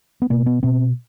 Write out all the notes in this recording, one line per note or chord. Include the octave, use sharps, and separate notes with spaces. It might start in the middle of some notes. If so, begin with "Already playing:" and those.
B3
B2 A#3
B3
B2 C4